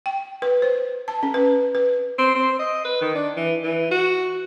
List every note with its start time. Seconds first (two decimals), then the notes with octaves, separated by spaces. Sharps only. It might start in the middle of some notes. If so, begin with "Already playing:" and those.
0.06 G5
0.42 B4
0.62 C5
1.08 A5
1.23 C#4
1.34 B4
1.75 B4
2.19 C4
2.35 C4
2.59 D#5
2.85 B4
3.01 D#3
3.15 D4
3.37 E3
3.63 E3
3.91 F#4